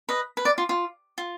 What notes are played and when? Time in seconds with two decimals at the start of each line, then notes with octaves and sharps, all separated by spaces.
0.09 B4 D#5
0.37 B4
0.45 D5
0.58 F4
0.69 F4
1.18 F4